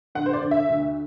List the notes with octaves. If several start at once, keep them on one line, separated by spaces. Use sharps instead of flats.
D3 F#5
C5
D5
D3
E5
D2